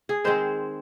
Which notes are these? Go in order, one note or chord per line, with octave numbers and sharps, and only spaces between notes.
G#4
D#3 G#3 C4 C5